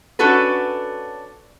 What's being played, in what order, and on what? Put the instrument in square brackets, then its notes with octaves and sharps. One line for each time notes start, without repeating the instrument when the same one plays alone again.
[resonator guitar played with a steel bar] C#4 D4 F#4 A4 B4